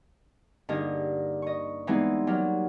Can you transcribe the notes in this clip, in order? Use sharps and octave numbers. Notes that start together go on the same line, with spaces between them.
G2 D3 A#3 D#4 G#4 D#5
D#5 C#6
E3 G3 G#3 B3 C4 D#4
F#3 G3 A#3